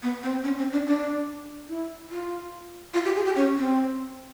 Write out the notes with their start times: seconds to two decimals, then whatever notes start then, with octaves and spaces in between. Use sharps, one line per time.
0.03 B3
0.23 C4
0.44 C#4
0.58 C4
0.72 D4
0.86 D4
1.69 E4
2.10 F4
2.94 F4
3.05 G4
3.15 G#4
3.25 G4
3.36 C#4
3.57 C4